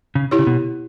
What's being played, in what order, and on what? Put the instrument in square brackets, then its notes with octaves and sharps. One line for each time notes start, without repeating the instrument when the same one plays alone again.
[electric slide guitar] C#3
[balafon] E4 G4 C#5
[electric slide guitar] C#3
B2